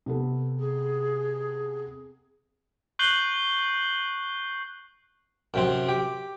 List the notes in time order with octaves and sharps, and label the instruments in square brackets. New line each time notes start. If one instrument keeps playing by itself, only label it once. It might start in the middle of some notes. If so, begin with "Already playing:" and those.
[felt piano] C3 B3 A4
[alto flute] G#4
[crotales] C#6 F#6 G6 C7 F#7 G7
[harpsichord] F#2 C3 C4
G4